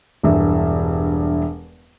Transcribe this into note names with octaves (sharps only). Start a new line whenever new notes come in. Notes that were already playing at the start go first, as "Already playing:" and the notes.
E1 G2 E5